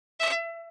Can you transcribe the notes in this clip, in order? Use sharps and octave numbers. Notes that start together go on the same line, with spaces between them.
E5